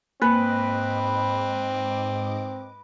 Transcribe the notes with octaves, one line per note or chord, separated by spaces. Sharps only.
G#2 A#3 C4 B4 D#5 D6